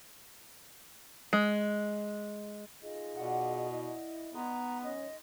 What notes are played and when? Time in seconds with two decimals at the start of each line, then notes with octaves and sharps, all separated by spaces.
1.33 G#3
2.82 D#4 F4 G#4 D#5
3.16 B2 D5 E5 F#5
3.70 E4
4.34 G#3 B3 D#4 G#4 A#5
4.84 F#3 C#4 D#5